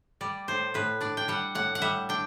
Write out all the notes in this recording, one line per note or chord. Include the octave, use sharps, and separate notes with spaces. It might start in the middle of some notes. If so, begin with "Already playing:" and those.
G3 D5
A2 C5
A2 B4
D4 D5
G5
G3 F#5
A2 F#5
F#5
G3 E5
D4 G5